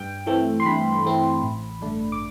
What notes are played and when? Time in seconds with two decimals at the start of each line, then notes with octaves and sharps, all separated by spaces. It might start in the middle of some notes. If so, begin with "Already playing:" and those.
Already playing: G2 G5
0.26 E3 A3 C4
0.60 C6
0.66 G2 B5
1.05 E3 A3 C4
1.43 A1
1.81 G2 D3 A3 D4
2.12 D6